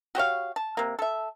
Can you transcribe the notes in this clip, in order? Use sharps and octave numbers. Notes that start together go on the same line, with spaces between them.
F#4 G4 C#5 F5
A5
C3 A#3
A4 E5